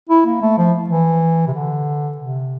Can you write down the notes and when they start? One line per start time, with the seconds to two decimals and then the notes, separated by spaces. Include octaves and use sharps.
0.09 E4
0.26 A#3
0.42 A3
0.58 F3
0.90 E3
1.47 C3
1.53 D3
2.18 C3